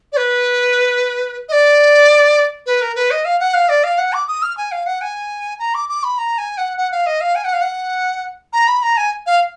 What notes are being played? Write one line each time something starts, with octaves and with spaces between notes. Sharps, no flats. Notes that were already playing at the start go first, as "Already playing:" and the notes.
D5
B4
D#5
D5
B4
A#4
B4
D#5
F5
F#5
F5
D5
F5
F#5
D6
D#6
F6
G#5
F5
F#5
G#5
A#5
D6
D6
B5
A#5
G#5
F#5
F#5
F5
D#5
F5
G#5
F#5
F5
F#5
A#5
B5
A#5
G#5
F5